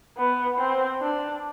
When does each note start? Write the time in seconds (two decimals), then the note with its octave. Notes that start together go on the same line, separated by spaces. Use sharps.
0.18 B3
0.59 C4
1.01 D4